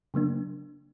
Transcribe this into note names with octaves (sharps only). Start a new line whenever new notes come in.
C#3 F#3 A#3 D4